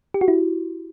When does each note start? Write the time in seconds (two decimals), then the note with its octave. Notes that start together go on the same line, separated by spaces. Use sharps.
0.14 G4
0.21 F#4
0.28 E4